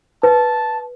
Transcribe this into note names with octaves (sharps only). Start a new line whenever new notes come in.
B4 A5